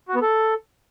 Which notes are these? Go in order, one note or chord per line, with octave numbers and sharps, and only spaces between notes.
F#4
B3
A4